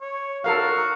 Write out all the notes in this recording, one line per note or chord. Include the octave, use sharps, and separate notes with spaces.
C#5
F#4 A4 A#4 F5